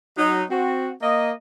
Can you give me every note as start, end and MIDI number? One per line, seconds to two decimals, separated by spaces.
0.17 0.43 54
0.17 0.43 63
0.50 0.90 60
0.50 0.90 66
1.02 1.32 58
1.02 1.32 75